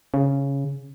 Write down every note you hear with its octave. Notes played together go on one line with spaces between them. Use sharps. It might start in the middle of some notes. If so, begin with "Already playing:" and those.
C#3